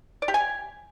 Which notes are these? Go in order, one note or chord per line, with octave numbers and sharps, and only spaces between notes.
D5
G4
G#5